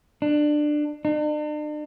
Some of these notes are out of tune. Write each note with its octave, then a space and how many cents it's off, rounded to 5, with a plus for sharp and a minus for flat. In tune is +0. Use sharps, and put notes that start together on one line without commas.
D4 +20
D4 +45